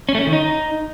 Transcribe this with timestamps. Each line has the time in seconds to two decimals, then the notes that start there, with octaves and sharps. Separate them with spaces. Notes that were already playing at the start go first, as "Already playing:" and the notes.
0.09 C#4
0.15 A3
0.21 C#4
0.27 D#3
0.33 D#4